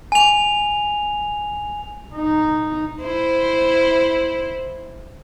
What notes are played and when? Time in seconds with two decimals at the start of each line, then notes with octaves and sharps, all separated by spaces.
0.12 G#5 F7
2.15 D#4
3.03 E4 C5